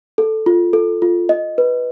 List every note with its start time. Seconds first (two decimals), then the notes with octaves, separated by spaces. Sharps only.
0.18 A4
0.46 F4
0.73 A4
1.02 F4
1.29 D#5
1.58 B4